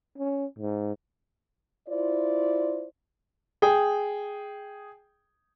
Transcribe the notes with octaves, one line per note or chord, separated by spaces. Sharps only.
C#4
G#2
E4 F4 C5 D5
G#4 G5